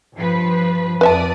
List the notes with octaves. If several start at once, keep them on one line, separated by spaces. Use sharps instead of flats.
G2 F3 B4
F2 B4 D5 E5 A5 D#6